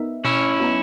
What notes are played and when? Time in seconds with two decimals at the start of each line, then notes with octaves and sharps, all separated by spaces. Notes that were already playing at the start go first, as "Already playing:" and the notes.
Already playing: B3 D#4 A#4 E5
0.25 B2 C#4 E4
0.60 F#3 B3 D#4